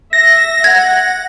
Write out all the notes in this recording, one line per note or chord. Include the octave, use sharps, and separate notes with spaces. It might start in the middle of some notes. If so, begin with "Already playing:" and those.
E5 A#6
F#5 G#6